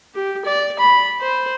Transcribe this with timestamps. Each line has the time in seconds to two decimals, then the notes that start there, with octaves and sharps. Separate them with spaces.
0.15 G4
0.45 D5
0.79 B5
1.20 C5